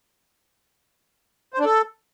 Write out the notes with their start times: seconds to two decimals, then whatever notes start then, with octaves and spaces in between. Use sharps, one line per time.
1.54 C5
1.59 D4
1.65 A4